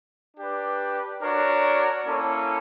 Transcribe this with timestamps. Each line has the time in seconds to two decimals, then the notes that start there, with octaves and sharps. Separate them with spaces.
0.37 D4 G4 B4
1.21 D4 F#4 A#4 C#5
2.06 A#3 C#4 E4 A4 C#5